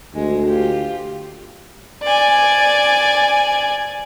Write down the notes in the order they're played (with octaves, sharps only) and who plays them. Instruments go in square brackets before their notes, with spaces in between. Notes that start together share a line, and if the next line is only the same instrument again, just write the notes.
[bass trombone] D2 [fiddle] G#3
[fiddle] F4 G4
D5 G#5